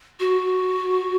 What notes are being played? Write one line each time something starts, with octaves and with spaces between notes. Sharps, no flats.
F#4